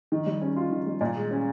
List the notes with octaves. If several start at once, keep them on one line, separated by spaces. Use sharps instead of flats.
D#3
G3
C#4
F4
D#3
G3
A#2
G#3
C#4